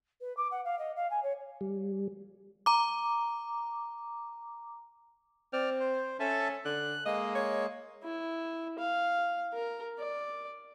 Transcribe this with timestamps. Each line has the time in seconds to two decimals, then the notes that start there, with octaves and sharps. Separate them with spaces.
0.21 B4
0.37 D6
0.51 F#5
0.65 F5
0.79 D#5
0.96 F5
1.10 G#5
1.23 C#5
1.61 G3
2.66 A#5 D6
5.53 C4 D5 F6
5.80 C5
6.20 C#4 A4 E5 A5
6.65 D3 F#6
7.05 G#3 A#3 D#5
7.35 C#5
8.04 E4
8.79 F5
9.54 A#4
9.99 D5